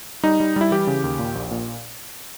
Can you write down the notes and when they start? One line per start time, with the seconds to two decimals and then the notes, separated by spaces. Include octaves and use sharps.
0.23 G3 D#4
0.40 G3
0.56 G3 E4
0.71 E3 G4
0.87 C#3
1.04 D#2
1.19 A#2
1.35 A#1
1.51 A#2